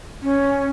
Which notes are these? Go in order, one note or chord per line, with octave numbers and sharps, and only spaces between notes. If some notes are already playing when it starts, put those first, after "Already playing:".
C#4